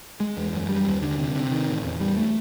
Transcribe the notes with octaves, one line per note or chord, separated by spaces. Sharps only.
G#3
E2
F#2
G3
D#2
D3
C3
C3
D#3
A1
E2
G3
A3